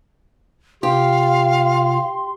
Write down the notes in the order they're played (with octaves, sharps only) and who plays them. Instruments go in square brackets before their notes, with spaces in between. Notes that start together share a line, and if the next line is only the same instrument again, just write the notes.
[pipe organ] C3 F4 [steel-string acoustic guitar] G4 [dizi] F5 [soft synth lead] C6